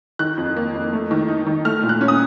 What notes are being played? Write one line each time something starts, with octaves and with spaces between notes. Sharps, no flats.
D#3 F#6
F2
A#3
F2
A3
D#3
D#4
D#3
A3 F6
A#2
F#6
C#4
D#6